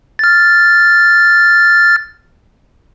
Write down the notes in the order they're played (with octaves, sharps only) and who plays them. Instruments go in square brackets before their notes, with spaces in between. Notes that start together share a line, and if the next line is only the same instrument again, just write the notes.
[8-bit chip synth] F6 A6